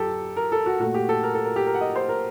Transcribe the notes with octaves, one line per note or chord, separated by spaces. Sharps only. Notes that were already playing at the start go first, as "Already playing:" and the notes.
Already playing: F#2 G4 A4
A#4
A4
F#4
A#2 A3 F#4
G4
A4
A#4
A4
A#4
G4
A#4
F#5
D#5
C5
A#4